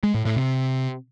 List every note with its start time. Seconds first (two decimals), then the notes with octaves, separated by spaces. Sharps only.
0.03 G#3
0.14 A2
0.25 A2
0.36 C3